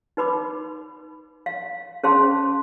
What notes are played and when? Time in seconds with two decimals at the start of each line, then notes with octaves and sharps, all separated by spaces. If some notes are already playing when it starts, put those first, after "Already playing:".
0.17 D#4 B4 B5 D6
1.46 F5
2.03 C#4 G#4 C5 F5 A5 C6